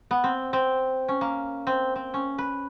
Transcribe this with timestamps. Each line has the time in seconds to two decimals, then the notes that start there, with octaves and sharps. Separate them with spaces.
0.11 B3
0.24 C4
0.53 C4
1.08 C#4
1.21 A#3
1.67 C4
1.96 C4
2.14 C#4
2.38 B4